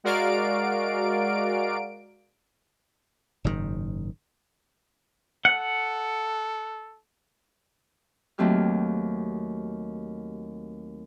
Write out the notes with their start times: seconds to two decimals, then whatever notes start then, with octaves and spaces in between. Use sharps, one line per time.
0.04 G#3 F#4 A#4 D5 F5 D7
3.44 F#1 G#2 B2 D#3
5.45 A4 F#5
8.38 D#2 F#3 A3 C4 G4 F6